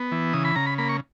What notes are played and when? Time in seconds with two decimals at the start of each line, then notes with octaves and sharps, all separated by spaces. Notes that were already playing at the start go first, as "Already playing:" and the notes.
Already playing: B3
0.12 E3
0.33 C#3 D#6
0.45 B5
0.56 C#3 A#5
0.66 B5
0.78 A#3 B5
0.89 C#6